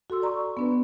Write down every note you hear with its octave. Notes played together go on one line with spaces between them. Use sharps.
F#4 A4 C6 E6
D5 A#5 C6 C#6
B3 D4 B4